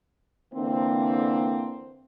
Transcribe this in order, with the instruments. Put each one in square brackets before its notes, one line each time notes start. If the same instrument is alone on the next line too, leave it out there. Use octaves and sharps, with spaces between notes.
[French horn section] D3 E3 A#3 C4